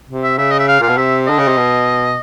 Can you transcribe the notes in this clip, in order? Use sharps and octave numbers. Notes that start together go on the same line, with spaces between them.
C3
E5
C#3 E5
D#5
E5
F5
A#2 F5
B2
C3 E5
D3 D#5
C#3
C3
B2